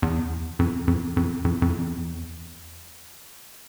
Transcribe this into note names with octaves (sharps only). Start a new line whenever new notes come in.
E2
F2
F2
F2
F2
F2
E2